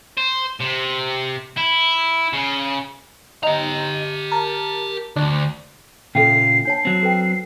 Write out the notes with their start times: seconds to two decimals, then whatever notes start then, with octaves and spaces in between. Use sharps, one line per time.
0.18 C5
0.61 C3
1.57 E4
2.33 C#3
3.43 D#4 G4 A#5
4.32 A#4 A5
5.16 D2 D4
6.15 A#2 C#3 F4 A4 E5 G5 C7
6.65 D4 C#5 A5 C7
6.85 F#3 C4
7.03 A4 B4 G5